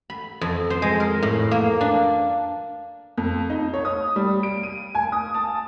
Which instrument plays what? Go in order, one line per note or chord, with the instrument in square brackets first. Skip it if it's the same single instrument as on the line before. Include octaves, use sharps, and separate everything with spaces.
[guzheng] B5
F2
C5
G#3
A#4
A2
A#3
D4
[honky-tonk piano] F2
D#4
C#5
D#6
G3
D7
D#7
G#5
D#6
A5